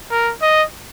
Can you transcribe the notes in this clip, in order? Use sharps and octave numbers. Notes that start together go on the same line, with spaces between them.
A#4
D#5